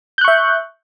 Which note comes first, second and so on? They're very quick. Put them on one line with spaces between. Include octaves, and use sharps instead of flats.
G6 F#6 C#6 E5